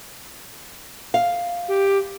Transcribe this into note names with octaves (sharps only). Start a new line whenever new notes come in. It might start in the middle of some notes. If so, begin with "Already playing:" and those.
F5
G4